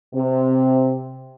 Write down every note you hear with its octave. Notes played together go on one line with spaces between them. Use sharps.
C3